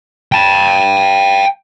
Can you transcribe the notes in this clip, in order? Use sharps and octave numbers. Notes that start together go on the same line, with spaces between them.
G5 A5